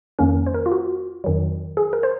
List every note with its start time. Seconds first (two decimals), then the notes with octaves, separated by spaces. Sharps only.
0.19 F2 D#3 A#3 C#4 A#4
0.46 C5
0.54 A#4
0.66 F4
0.72 F#4
1.24 F2 D#3 F#3
1.77 G#4
1.93 A#4
2.03 C5